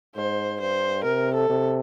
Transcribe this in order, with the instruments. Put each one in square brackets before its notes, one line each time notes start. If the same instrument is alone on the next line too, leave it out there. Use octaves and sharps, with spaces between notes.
[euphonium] G#2 [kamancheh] C5
[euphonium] G2 [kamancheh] C5
[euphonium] C3 [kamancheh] A#4
[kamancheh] A4
[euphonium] C3